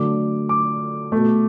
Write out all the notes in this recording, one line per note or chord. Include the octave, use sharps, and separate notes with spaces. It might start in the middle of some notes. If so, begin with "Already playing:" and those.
Already playing: D3 F#3 A3 D6
D6
B2 A3